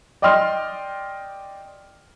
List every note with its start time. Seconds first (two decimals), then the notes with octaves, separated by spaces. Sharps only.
0.22 D5 D#5 G5 C6 F6